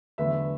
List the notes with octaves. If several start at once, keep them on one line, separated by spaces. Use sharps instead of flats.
E2 D3 F#3 A3 B4 E5